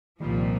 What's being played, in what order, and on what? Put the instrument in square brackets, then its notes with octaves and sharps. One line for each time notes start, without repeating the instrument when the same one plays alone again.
[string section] C2 A#2 F3 [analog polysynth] D#3 G3